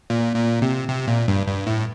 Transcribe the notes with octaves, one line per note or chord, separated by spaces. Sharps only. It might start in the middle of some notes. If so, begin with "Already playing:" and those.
A#2
A#2
C3
C3
A#2
G2
G2
A2